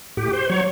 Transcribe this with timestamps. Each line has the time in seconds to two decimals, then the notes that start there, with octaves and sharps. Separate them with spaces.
0.17 A2 G4
0.33 C5
0.49 F#3 C#5